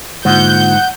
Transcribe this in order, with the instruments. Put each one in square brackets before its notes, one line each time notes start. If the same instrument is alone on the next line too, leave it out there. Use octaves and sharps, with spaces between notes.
[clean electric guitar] G#2 [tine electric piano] D3 A#3 F4 [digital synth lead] F#5 [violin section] G6